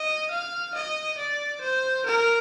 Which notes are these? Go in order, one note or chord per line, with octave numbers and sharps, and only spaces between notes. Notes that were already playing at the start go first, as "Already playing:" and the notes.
Already playing: D#5
F5
D#5
D5
C5
A#4